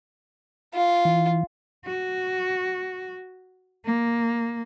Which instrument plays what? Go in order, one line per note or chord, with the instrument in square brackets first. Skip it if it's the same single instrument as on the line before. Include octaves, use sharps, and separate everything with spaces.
[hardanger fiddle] F4
[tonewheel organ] E3
[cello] F#4
A#3